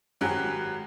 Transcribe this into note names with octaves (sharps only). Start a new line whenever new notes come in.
G#1 F#3 G4 G#4 F#6